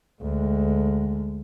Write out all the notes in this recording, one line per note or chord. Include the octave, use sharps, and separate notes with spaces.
D2 G#3